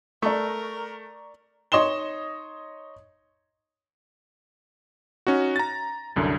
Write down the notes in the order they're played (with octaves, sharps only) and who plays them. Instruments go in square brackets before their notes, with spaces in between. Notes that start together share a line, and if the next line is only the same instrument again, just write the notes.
[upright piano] A3 [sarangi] A#4 [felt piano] D5 A#5 C#6
[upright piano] D#4 C#5 D#5 C6 E7 G7
[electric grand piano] C#4 D#4 F#4
A#5 A6
C2 F#2 D3